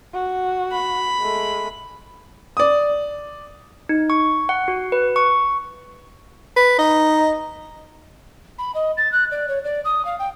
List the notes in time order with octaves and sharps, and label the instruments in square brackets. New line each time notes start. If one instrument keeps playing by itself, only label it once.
[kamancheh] F#4
[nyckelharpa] B5
[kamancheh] G#3 A3
[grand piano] D5 D#6
[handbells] D#4
C#6
F#5
F#4
B4
C#6
[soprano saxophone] B4
[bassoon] D#4 [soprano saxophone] D#5
[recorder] B5
D#5
A6
F#6
D5
C#5
D5
D#6
F5
G5